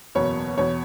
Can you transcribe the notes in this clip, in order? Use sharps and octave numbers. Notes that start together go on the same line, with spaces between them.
F#1 E2 B2 C#5
E2 B2 C#5